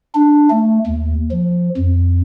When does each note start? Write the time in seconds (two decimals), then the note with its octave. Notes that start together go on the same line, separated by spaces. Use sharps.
0.15 D4
0.50 A3
0.87 D#2
1.31 F3
1.77 F2